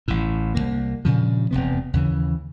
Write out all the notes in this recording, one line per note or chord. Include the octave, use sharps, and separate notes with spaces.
A1 A2
C2 F#2 A#3
G2 A#2 C#3 F3
E1 A2 C3 B3
D#2 C#3 E3